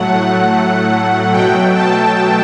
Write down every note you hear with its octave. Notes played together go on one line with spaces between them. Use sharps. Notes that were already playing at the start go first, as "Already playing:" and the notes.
Already playing: A2 F#3 A3 F#5
B2 F#3 A3 G5
A5